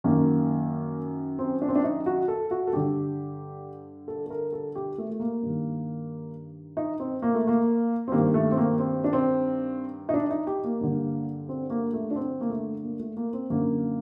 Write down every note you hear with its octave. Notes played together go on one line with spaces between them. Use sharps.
F#2 D#3 A#3
C4
D4
C4
D4
D#4
F#4
A4
F#4
A4
G2 D3 G4
A4
A4
A#4
A4
G4
A3
A3
A#3
G2 D#3
D#4
C4
A#3
A3
A#3
C4
G2 D#3 A#3
A3
C4
A#3
C4
D4
C4
D#4
D4
D#4
G4
A#3
G2 D3
C4
A#3
A3
D4
C4
A#3
A3
A#3
A3
A#3
C4
F#2 D3 A#3